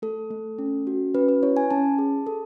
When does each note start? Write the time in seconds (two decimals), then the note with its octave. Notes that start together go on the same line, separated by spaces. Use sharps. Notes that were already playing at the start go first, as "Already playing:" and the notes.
0.02 A3 A4
0.31 A3
0.59 C#4
0.87 F#4
1.15 C#4 B4
1.29 B4
1.43 E4 C#5
1.57 G#5
1.70 C#4 A5
1.99 G#4
2.27 A4